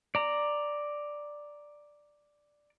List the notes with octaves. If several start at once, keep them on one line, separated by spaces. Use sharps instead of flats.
D5 A#5